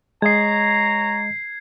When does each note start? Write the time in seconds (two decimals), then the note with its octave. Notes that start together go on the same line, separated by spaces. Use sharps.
0.22 G#3 C#5 D#5 A#5 G#6 C7